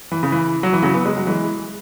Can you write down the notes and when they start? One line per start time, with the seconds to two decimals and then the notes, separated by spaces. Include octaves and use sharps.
0.12 E3
0.23 C#3
0.32 E3
0.63 F#3
0.73 E3
0.82 C#3 F#3
0.94 B3
1.05 G#3
1.17 F#3
1.27 E3 G#3